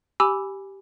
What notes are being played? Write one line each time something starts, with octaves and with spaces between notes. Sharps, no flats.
G4 G#5 B5 D6 E6